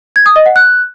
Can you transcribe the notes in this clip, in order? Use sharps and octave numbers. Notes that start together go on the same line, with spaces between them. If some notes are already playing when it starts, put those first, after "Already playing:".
G#6
D#6
D#5
F#5
F#6